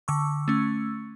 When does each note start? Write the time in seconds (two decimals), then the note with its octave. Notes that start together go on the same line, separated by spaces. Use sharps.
0.08 D3 C#6 E6
0.48 A3 C#4